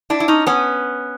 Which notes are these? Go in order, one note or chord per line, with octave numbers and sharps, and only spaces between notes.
D4 E4
E4
C#4 D#4
B3 C#4